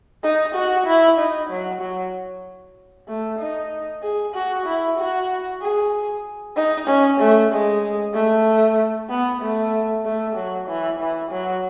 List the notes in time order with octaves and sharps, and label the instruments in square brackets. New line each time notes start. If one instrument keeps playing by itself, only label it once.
[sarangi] D#4
F#4
E4
D#4
F#3
F#3
A3
D#4
G#4
F#4
E4
F#4
G#4
D#4
C#4
A3
G#3
A3
B3
A3
A3
F#3
E3
E3
F#3